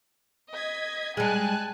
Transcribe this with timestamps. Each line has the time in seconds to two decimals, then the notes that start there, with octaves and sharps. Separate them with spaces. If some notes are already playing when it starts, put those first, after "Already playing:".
0.53 D#5 G#6 B6
1.17 G3 G#3 G#5 A5 F#6